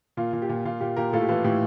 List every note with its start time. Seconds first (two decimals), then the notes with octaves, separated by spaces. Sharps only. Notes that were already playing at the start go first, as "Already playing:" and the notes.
0.17 A#2 F4
0.33 A#2
0.42 G4
0.49 A#2
0.65 A#2 F4
0.81 A#2 G4
0.96 A#2 G4 A#4
1.13 A2 F4 A4
1.22 G4
1.29 E3 F4 A4
1.44 A2 G4